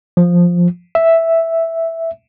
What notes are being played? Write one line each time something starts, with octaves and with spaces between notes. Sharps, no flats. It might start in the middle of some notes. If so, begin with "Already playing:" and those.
F3
E5